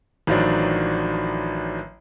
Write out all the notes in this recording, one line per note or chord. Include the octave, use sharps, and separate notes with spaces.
A1 D#3 F3 F#3 D4